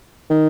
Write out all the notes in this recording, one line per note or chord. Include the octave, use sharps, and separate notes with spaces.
D#3